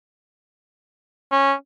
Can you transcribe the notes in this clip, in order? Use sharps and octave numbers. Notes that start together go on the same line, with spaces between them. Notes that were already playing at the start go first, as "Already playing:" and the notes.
C#4